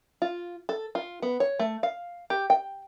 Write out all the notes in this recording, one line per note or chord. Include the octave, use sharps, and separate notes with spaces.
F4
A4
F4
B3
C#5
A3
F5
G4
G5